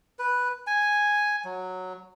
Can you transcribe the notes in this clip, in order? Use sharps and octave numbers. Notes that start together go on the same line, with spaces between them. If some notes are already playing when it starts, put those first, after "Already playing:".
B4
G#5
F#3